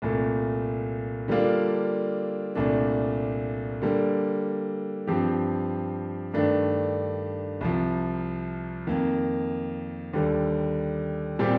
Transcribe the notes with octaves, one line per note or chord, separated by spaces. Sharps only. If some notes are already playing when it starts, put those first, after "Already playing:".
C2 A#2 A3
D3 G3 A#3 D4 F4
C2 A#2 A3 D4
D3 G3 A#3
G2 F3 C4 G4
G2 D#3 A3 D4
C2 C3 F3
F2 D#3 A#3
D#2 D3 G3
A#2 G3 C4 G4